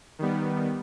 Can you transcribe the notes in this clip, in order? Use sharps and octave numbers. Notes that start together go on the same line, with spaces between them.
D#3 G3 B3